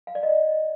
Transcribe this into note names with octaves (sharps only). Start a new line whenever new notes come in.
F5
D5
D#5